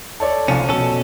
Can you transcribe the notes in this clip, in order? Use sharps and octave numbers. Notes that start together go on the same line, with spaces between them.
A4 C#5 D5
C2 F3 C#4 D#7
B2 C#4 A4